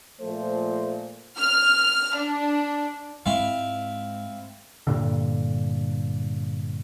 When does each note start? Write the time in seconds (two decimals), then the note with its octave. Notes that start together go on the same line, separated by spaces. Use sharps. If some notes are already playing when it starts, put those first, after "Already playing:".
0.21 A#2 F3 A3 C5
1.37 F6
2.15 D4
3.26 G#2 C4 E4 F5
4.87 G2 A#2 D3